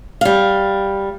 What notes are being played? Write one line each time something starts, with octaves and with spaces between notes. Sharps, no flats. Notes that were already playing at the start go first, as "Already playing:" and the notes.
G3 F5